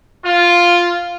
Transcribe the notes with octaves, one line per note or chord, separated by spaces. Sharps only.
F4